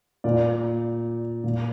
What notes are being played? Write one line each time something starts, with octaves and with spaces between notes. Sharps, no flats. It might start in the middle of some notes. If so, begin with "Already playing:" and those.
A#2 D5
A#2